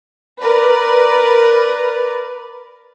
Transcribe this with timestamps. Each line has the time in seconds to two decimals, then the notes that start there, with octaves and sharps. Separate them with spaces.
0.40 A#4 B4 D5